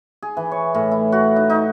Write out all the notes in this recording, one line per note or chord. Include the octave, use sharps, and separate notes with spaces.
G#4
E3
C#5
A2
E4
F#4
D#4
D#4